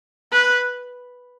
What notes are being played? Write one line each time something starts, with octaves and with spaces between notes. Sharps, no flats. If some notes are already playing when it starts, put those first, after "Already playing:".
B4